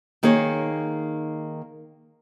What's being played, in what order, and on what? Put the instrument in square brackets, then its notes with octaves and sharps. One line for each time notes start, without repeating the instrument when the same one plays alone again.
[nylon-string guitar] D#3 A#3 D#4 G#4 C#5